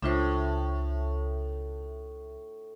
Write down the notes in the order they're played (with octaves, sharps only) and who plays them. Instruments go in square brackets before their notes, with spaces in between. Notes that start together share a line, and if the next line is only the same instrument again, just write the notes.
[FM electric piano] C#2 E5 [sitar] A2 [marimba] D4 F4 C5